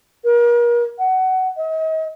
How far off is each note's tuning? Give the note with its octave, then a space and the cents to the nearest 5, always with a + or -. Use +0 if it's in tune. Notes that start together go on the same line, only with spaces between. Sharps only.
A#4 +35
F#5 +20
D#5 +40